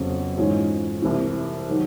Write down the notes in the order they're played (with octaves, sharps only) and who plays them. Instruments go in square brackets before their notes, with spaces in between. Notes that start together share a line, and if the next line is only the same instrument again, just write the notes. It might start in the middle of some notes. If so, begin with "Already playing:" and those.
Already playing: [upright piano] F2 C#3 F#3 B3
G#2 E3 G#3 C#4 F4
C2 C3 E3
D#3 F#3